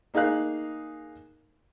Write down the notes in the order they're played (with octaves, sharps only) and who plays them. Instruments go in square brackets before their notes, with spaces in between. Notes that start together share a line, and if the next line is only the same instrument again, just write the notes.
[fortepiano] A#3 D#4 G#4 F5 F#6